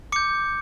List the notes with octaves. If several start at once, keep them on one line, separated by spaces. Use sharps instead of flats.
D6 G6 C#7